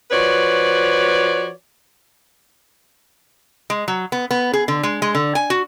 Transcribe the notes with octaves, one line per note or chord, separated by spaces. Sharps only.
F3 F#4 B4 C#5 D5
G#3
F#3
B3
B3
G#4
D3
G#3
G#3
D3
G#5
F#4